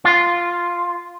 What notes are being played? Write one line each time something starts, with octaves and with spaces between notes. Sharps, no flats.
F4